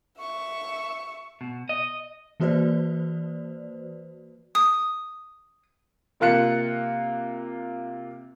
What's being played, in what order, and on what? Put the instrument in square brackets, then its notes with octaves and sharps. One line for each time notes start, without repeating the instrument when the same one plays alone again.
[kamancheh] E5 C#6
[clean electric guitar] B2
D#5
[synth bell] E3 A#3 F#4 B4 C5 D5
[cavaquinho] D#6
[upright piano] C3 A#3 F4 F#6 C#7